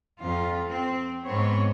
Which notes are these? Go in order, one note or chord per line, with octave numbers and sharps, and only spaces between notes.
F2 F4
C4
G#2 B3 C4 C#5